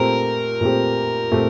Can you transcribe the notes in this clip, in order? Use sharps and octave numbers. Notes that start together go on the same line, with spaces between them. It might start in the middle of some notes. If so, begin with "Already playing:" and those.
Already playing: A#2 A3 C4 G4 A#4
A#2 A3 C4 G4
A#2 A3 C4 G4